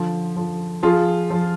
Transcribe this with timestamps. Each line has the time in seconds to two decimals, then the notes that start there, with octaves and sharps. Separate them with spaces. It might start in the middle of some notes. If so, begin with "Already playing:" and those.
Already playing: D3 F3
0.37 F3
0.83 F3 F4 G#4
1.30 F3